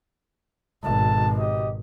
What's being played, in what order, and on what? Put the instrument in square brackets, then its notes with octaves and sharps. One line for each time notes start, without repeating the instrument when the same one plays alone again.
[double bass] G#1 B2 [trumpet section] A4 A5
[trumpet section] G4 D#5